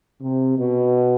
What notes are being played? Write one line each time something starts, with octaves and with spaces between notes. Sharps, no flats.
C3
B2